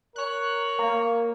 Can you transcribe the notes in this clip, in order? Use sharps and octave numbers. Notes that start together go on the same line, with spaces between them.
A#4 C#5 F#6
A#3